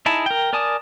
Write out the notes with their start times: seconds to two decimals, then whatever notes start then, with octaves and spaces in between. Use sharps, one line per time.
0.06 D#4 E4 G#4 A5
0.26 A#4 G5
0.53 A#4 D5 G#5 A5 D#6